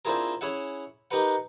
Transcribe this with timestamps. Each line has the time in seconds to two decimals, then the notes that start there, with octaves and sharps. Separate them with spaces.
0.05 C4 D4 E4 F4 G#4 A#4
0.41 C#4 E4 G#4 E5 F#5
1.11 D#4 G4 A#4 B4 F#5